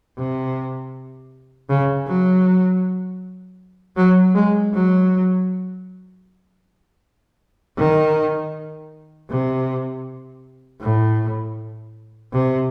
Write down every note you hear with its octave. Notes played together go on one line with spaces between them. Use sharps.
C3
C#3
F#3
F#3
G#3
F#3
D#3
C3
A2
C3